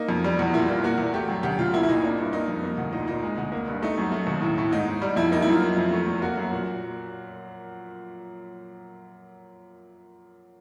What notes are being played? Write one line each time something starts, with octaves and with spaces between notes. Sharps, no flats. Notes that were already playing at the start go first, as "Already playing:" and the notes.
Already playing: A#3 D#4
F2
G3
E2
A#2 E4
A#2 F4
A#3 F#4
E2
A3 G4
F#2
D2 G4
D2 F4
A#2 E4
E4
A#2 D#4
A#3 D4
G2
A#3 D#4
F2
A#3
D2
A#2 D#4
A#2 D#4
G#3
D2
A#3
G2
A3 D#4
F#2
A3
D#2
A2
A2
G#2 D#4
G#2
G3
F2 E4
A#3 D#4
E4
F#2
F4
A#3
F2
A3
E2
A#3 F#4
F#2
A#2